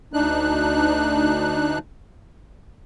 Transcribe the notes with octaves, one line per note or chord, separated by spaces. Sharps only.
D2 D4 D#4 F#6